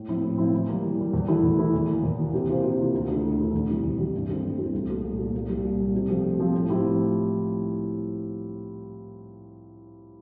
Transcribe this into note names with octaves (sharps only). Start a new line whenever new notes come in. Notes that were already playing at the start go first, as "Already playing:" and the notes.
Already playing: A2
F3 C4 E4
A2
F3 C4 E4
E3
G3 A#3
E3
G3 A#3
E2
E3 A3 E4
E2
E3 A3 E4
E2
E3 A#3
E2
E3 A#3
C3
E3 A#3 F4 C5
C3
E3 A#3 F4 C5
D2
D3 A3 E4
D2
D3 A3 E4
E2
C3 E3 G3
E2
C3 E3 G3
G2
E3 A3 C4 E4
G2
E3 A3 C4 E4
C2
A#2 A3
C2
A#2 A3
C2
A#2 G3
C2
A#2 G3
C3
F3 A3 C4
C3
F3 A3 C4
A2
F3 C4 E4 G4
A2